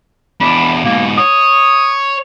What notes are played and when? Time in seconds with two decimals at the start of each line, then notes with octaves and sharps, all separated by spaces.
0.41 E2 D4 B5
0.84 G#2 B2 A#3
1.18 C#5 D#6